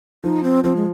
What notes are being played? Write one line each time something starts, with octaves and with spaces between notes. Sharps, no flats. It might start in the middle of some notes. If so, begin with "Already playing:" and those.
F3 D#4
C4
F3 C4
G#3